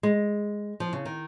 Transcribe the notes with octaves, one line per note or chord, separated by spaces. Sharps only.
G#3
F3
C#3
D#3